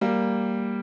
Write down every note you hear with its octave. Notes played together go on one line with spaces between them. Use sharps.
G3 A#3